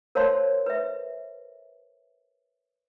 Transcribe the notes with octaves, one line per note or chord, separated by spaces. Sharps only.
A#4 C5 C#5 F5 A5 C6
B4 E5